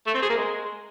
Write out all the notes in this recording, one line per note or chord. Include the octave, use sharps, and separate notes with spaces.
A3
C4
G#4
A#3
G#3